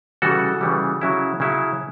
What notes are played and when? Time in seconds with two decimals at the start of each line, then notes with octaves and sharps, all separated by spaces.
0.22 C#3 E3 G3 F#4 A4
0.61 C#3 E3 G3
1.01 C#3 F#3 C#4 E4
1.40 C#3 F#3 C#4 E4